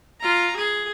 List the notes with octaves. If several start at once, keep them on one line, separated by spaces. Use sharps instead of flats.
F4 A#5
G#4